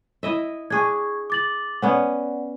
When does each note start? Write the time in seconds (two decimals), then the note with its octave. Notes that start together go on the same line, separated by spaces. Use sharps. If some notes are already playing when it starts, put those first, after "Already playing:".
0.23 E4 D#5 E5
0.70 D4 G#4 C#6 G#6
1.30 D6 A6 F#7
1.82 B3 C#4 D5 F#5